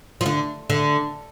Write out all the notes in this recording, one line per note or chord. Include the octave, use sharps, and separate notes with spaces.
F3
D3
D3